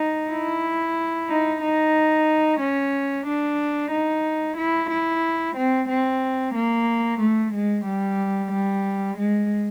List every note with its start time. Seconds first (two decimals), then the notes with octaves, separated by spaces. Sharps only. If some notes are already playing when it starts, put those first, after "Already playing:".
Already playing: D#4
0.31 E4
1.29 D#4
1.62 D#4
2.60 C#4
3.26 D4
3.91 D#4
4.57 E4
4.91 E4
5.56 C4
5.88 C4
6.54 A#3
7.20 A3
7.53 G#3
7.85 G3
8.52 G3
9.17 G#3